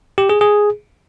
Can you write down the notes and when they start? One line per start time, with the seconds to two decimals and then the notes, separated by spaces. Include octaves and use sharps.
0.18 G4
0.29 G#4
0.41 G#4